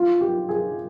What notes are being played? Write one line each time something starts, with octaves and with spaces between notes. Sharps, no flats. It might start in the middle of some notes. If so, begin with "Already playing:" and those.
Already playing: F4
G4
G#4